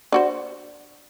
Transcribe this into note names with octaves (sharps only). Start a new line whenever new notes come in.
D4 F#4 C5